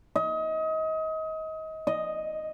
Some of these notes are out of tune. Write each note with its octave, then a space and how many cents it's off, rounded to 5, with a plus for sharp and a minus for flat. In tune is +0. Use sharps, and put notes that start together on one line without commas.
D#5 +30
D#5 +0